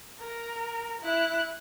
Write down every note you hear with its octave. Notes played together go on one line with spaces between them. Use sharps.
A#4
E4 F#6